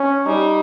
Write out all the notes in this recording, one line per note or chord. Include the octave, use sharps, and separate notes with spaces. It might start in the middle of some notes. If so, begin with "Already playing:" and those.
Already playing: C#4
G3 D#4